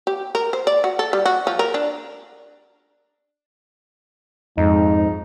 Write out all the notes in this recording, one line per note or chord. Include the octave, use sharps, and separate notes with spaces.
G4
A#4
C5
D5
F#4
A4
G3
F#4
F3
A#4
D4
F2 G#2 D#4